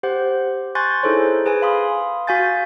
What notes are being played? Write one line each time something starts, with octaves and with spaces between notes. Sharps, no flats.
G4 C5 F#5
G#5 C6 C#6 F#6 G6 A6
D#4 E4 G#4 A4 C5 C#5
G#4 B4 G#5
F5 B5 C6 D#6
F#4 F5 G#5 G6 A6